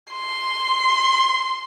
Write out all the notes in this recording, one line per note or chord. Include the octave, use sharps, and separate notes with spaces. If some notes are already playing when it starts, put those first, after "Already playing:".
C6